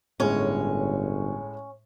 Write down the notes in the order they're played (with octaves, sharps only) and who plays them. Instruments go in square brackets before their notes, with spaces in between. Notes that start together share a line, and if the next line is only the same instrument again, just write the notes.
[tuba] G1 [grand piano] A2 G#3 [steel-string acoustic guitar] C#4 C#5